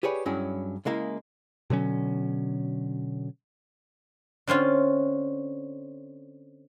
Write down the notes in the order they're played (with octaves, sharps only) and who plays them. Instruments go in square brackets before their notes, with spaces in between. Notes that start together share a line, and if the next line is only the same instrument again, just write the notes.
[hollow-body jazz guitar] G4 G#4 B4 C#5 D5
G2 F#3 C#4 E4 G#4
C#3 G#3 A#3 E4
[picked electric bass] B2 D3 F#3 C#4
[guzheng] D3 C4 C#4 F4